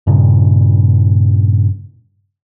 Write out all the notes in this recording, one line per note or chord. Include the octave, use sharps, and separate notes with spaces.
G2 A#2 C#3